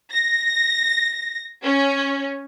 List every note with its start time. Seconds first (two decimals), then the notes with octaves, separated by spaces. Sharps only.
0.10 A#6
1.64 C#4